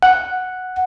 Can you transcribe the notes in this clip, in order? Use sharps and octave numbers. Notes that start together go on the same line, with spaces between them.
F#5